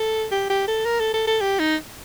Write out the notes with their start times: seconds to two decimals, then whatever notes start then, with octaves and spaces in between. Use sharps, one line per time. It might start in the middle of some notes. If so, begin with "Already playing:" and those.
Already playing: A4
0.32 G4
0.50 G4
0.68 A4
0.85 A#4
1.00 A4
1.14 A4
1.27 A4
1.41 G4
1.59 D#4